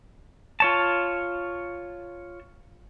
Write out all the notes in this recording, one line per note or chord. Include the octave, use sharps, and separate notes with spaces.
F4 C#5 A5